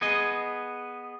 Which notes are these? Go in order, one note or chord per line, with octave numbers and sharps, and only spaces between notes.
B3 G#4 D#5